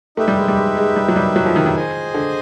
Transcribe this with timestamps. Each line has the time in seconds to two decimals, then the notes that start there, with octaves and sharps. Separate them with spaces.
0.17 A3 D#4 G4 B4 E5
0.28 G3
0.37 G#3
0.48 G3
0.57 G#3
0.77 G#3
0.96 G3
1.08 F#3
1.16 G3
1.36 F#3
1.46 F3
1.56 D#3
1.66 D#3
1.76 G#4 C5 D#5 G#5
2.14 D3